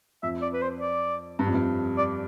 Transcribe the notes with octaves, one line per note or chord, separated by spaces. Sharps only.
F2 E5
D5
B4
C5
D5
G2
F2
G2
D5